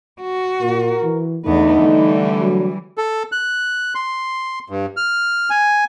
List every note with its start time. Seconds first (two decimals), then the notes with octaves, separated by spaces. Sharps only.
0.22 F#4
0.62 A#2 A#4
1.03 E3
1.45 E2 D3 A3 B3 D#4
1.83 E3 G3
2.41 F#3
2.98 A4
3.32 F#6
3.95 C6
4.70 G2
4.97 F6
5.50 G#5